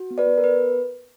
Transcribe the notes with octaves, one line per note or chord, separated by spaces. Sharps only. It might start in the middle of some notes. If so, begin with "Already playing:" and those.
Already playing: F#4
B3
B4 D5
B3
A#4
B3 B4